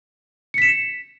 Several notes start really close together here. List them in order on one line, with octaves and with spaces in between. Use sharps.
C#7 B6 E7